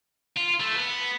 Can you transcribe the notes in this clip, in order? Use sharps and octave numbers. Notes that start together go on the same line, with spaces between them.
F4
A3
B3